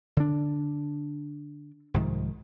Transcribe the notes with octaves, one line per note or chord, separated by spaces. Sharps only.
D3 D4
C2 G#2 D#3 F3